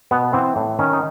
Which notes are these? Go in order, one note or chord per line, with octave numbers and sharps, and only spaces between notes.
B2 B3
E3 C4
A2
D#3 C#4
D#4